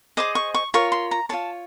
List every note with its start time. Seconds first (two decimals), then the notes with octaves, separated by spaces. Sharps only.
0.17 G#4 C5 D#5 D6
0.35 C#6
0.54 C#6
0.74 F4 A#4 C#5 C#6
0.92 C6
1.11 A#5
1.29 F4 G#4 C#5 A5